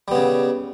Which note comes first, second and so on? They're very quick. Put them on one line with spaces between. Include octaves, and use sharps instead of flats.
G3 B3 C#3